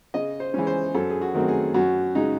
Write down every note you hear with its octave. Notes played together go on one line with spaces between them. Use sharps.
C#3 D#5
C5
E3 G#3 C#4
C5
F#2 A4
G#4
F#4
D#3 F#3 A3 C4
G#4
F#2 F#4
C#3 G#3 D#4